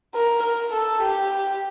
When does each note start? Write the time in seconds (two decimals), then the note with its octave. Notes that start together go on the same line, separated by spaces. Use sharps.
0.15 A#4
0.43 A#4
0.73 A4
1.03 G4